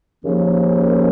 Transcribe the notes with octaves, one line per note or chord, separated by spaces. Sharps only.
D#2 C#3 F3 A#3 C#4